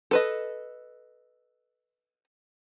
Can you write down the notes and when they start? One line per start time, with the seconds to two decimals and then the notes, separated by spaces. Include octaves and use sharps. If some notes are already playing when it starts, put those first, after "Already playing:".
0.11 A4 B4 D#5